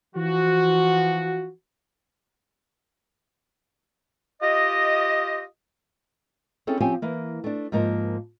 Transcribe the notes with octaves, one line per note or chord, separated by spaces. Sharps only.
E3 F3 F#4
F4 G4 D#5
C4 C#4 E4 G#4 A4
F3 C4 C#4 G4 F5 G#5
E3 A#3
A3 D4
G#2 F3 A#3 A#4 C5